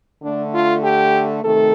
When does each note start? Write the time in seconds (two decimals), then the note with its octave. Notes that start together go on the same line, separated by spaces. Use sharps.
0.22 D3 A3 D4
0.53 F4
0.83 G4
1.44 C3 D#3 A3 A4